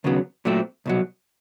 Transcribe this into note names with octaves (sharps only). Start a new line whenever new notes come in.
D#2 C#3 F#3 B3
A#2 F#3 A3 C4
C2 B2 F#3